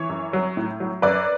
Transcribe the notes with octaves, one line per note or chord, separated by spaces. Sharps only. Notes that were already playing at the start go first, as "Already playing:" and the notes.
Already playing: E3 C#5
F#2
F#3
A2
F#3
F#2 B4 D5